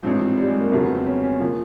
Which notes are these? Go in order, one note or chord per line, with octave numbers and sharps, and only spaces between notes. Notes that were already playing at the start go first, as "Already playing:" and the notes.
A1 G#2 F3 C4
C4
G3
G#3
A#3
G1 F2 C#3 F#3 A#3
B3
C4
C#4
C#4
C#3 F3 A#3